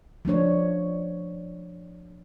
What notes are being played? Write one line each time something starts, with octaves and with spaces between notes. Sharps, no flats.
F3 A3 D4 C#5